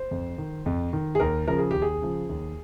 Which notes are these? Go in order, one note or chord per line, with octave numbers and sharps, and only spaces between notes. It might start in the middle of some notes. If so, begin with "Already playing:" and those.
Already playing: C5
F2
D#3
F2
D#3
G#4
D#2 A#4
C#3 F3 A#4
G#4
D#2 G4
G#4
C#3 F3
D#2